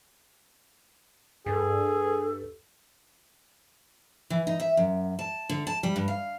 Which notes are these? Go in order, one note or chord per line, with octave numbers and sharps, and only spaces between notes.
G2 G#4 A4
E3
D#4
E5
F#2
A5
D3
A5
G3
G2
F5